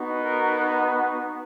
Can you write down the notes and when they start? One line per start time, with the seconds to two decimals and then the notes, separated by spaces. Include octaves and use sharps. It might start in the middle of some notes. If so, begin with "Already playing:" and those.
Already playing: B3 D#4 F#4
0.24 A#4